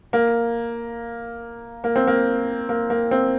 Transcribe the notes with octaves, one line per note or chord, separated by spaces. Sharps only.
A#3
A#3
C4
A#3
A#3
A#3
C4